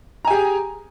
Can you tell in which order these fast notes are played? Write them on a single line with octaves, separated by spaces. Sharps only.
A#5 G#5 G4 G#4